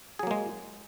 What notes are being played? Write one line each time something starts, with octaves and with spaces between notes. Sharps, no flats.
F#3 G#3 A#3 G#4